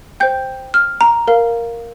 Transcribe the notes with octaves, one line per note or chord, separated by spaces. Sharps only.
C5 G5 G6
F6
A#5
A#4 F5